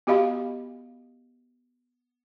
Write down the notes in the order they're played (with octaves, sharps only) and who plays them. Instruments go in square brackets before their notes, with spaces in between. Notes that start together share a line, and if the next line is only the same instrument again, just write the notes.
[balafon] B3 F#4 G4 D#5 F5 B5